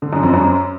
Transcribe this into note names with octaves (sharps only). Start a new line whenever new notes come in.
D3
F#2
F2
F#2